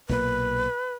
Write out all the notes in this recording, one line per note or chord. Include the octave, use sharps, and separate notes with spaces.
B1 A#2 A#3 B4